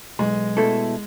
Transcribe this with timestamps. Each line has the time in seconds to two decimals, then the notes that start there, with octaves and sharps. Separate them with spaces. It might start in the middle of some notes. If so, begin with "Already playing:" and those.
0.19 B1 G#3
0.57 B2 A3 E4 A4